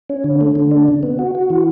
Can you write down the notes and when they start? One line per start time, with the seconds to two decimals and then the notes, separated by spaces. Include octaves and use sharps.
0.09 C#4
0.24 D3
0.41 A3
0.55 D3
0.71 D4
0.88 C#3
1.03 B3
1.19 F#4
1.35 F#4
1.50 E3